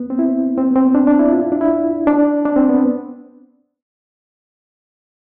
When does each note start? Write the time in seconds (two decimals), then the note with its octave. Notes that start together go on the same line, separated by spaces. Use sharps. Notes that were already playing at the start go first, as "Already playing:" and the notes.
Already playing: B3
0.10 C4
0.19 E4
0.58 C4
0.71 B3
0.76 C4
0.95 D4
1.07 D4
1.19 E4
1.33 F4
1.42 E4
1.52 D4
1.61 E4
2.07 D4
2.45 D4
2.56 C4
2.69 B3